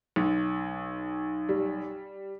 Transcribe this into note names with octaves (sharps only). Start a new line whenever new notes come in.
B1
G3